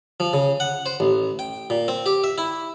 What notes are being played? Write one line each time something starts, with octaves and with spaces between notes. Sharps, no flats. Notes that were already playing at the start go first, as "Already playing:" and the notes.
F3
C#3
F#5
C5
A1
G5
A#2
C4
G4
E5
E4